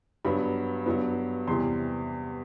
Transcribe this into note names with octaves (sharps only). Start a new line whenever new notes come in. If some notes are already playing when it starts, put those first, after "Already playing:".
G2 F#3 B3 B5
G2 F#3 B3
E2 C3 E3 G3 C6